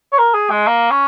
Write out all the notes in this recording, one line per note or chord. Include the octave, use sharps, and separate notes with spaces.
C#5
A#4
G#4
G#3
A#3
C#4